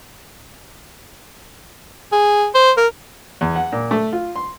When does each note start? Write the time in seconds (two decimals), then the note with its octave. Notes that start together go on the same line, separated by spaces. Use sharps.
2.12 G#4
2.55 C5
2.77 A#4
3.41 E2
3.56 F#5
3.72 A#2
3.91 A3
4.13 F4
4.36 C6